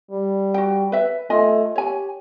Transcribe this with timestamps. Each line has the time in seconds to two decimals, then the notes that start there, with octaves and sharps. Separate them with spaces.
0.11 G3
0.54 F#4 G5
0.92 B4 E5
1.30 A3 F4 D#5 G#5
1.76 G4 C#5 G#5